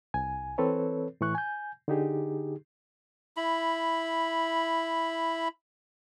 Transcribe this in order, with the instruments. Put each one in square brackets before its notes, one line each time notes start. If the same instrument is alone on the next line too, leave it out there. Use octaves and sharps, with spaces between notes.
[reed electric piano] C2 G#5
E3 C4 A4 B4 C#5
A2 E3 C#6 F#6
G#5 G6
D3 D#4 G4 G#4
[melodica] E4 B5